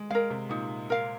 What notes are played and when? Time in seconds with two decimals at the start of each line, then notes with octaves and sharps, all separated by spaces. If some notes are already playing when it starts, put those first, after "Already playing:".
Already playing: G#3
0.10 G#3 A#4 F5
0.30 C3
0.49 A#2 D#4
0.90 A#4 F5